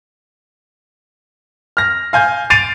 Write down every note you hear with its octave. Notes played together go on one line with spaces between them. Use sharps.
F6 A#6
F5 G#5 G6
A6 C7 D7 D#7 F7